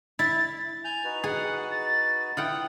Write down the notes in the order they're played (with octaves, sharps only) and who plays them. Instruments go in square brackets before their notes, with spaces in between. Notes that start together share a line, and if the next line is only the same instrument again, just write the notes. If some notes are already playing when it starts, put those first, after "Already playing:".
[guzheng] E4 [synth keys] A6
[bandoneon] G#5 G6 [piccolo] F7
[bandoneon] D#4 F#4 B4
[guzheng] G#4 [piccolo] F#5
[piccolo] A6
[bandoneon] E4 [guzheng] F4 F#5 G5 [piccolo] D#6